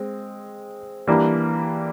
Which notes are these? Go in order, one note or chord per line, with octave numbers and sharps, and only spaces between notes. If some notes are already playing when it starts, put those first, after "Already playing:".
Already playing: G#3 C4
E3 G3 A#3 D4